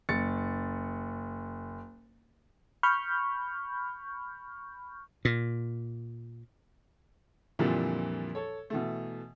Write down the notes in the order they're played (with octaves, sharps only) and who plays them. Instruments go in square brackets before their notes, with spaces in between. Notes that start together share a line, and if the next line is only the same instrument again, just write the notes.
[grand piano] F#1 A6 C#7
[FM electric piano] B5 C#6 F6 G6
[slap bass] A#2
[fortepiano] F2 A#2 D3 E3 F3 G3
A4 C#5
B2 E3 A3